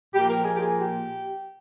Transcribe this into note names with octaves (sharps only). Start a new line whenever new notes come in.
A#2 F3 A#3 G4
A#4
G#4
G4
G#4
G4